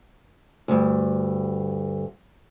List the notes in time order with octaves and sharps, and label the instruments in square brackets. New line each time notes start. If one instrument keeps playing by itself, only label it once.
[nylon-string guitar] D2 G2